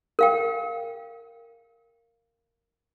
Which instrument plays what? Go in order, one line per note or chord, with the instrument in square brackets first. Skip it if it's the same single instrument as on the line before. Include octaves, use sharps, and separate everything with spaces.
[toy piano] A#4 F5 G5